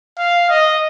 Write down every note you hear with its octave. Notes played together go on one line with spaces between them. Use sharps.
F5
D#5